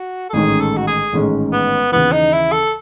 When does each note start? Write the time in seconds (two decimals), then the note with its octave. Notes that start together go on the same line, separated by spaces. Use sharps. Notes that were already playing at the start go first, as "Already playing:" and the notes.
Already playing: F#4
0.30 A4
0.33 A1 G#2 D#3 G#3 C#4 G#4
0.60 A4
0.77 F#4
0.87 G#4
1.13 A1 G#2 D#3 G#3 C#4
1.53 B3
1.92 D#2 C#3 E3 B3
2.12 D#4
2.32 E4
2.52 A4